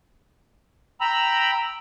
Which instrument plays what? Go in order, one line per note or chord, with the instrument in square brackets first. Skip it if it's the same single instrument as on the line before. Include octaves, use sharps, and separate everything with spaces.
[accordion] G5 A#5 B5 E6